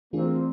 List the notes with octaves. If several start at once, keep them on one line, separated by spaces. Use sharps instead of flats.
E3 A3 A#3 C4 D4 F4 G#4